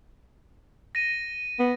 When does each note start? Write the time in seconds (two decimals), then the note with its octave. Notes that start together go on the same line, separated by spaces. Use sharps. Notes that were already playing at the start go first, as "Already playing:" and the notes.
0.95 A#6 D#7
1.59 B3